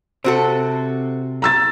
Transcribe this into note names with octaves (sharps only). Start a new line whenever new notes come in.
C3 C4 F#4 A4
A#5 E6 A6